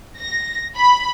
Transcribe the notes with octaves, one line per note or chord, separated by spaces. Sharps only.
A#6
B5